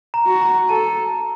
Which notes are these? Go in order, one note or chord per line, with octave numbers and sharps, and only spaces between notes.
A#5
F#4
A#5
A4 A5